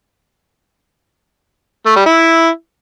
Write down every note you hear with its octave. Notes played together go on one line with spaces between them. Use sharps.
A3
G3
E4